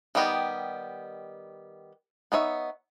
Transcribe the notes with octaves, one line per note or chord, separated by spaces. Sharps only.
D#3 G3 B3 G4 D#5
B3 D#4 C#5 E5